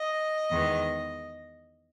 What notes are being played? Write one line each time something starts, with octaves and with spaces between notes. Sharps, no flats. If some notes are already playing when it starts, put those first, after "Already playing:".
Already playing: D#5
E2 D#3 G#3 B3